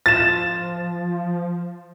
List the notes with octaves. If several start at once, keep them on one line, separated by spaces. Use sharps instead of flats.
F3 A6 E7